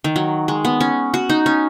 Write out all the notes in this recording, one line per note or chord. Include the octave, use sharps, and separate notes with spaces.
D#3
F#3
G#3
B3
C#4
F#4
D#4
C#4